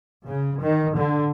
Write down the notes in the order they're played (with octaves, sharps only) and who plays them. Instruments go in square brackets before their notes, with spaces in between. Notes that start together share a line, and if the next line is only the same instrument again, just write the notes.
[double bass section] C#3
D#3
D3